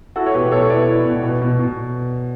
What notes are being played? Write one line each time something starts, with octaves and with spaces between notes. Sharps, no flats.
E4 F#4 A4
C#5
B2 G4 B4
B2 A4 C#5
E4 B4 D5
E4
B2
B2
B2
B2